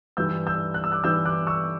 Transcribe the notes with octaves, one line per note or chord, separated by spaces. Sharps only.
G2 E3 G3 E6 G6
E6 G6
F#6
E6
D6 F#6
G2 E3 G3 E6 G6
D6 F#6
C#6 E6